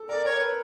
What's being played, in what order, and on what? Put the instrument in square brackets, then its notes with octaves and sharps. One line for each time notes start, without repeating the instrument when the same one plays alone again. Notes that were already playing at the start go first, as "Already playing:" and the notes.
Already playing: [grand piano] A4
[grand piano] A#4 [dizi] D5
[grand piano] A#4 [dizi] C#5
[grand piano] B4